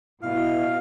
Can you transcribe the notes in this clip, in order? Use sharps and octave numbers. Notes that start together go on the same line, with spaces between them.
B2 E4 F5